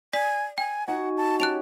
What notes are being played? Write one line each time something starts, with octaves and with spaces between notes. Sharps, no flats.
D5 G#5 B6
G5 G#5
D#4 F#4 F#5 G#5
A5
C#4 G4 A5 F#6 D7 F7